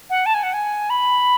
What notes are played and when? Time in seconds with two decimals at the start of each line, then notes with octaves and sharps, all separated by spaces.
0.10 F#5
0.26 A5
0.34 G#5
0.43 F#5
0.53 G#5
0.90 B5